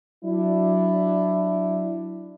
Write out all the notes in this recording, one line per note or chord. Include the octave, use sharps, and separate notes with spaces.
F#3 D4 E4